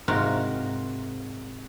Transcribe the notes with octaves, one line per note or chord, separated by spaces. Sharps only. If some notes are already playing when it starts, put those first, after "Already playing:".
G#2 C3 F4 F#4 A#4